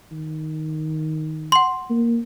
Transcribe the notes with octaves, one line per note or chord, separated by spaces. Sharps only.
D#3
F#5 C6
A#3